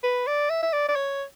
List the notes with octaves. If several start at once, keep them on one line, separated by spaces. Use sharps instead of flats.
B4
D5
E5
E5
D5
D5
C#5